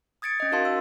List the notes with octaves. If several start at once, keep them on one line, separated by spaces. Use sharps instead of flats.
D#6 G#6 A6 C#7 D7
C#4 D#5
D#4 F#4 A#4 F5 A5 C6
E6